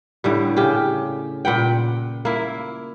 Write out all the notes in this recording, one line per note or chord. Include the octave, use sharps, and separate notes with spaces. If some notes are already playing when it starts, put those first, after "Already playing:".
A2 D3 G3
C#3 G4
A#2 B4 F#5 G5
A#3 E4